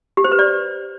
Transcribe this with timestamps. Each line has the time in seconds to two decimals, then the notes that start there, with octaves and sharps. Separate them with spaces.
0.17 G4
0.24 C5
0.32 B4
0.39 D5